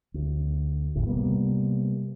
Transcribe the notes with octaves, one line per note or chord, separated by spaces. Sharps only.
D2
A#1 D#2 A2 C#3
C3 G3 A#3 B3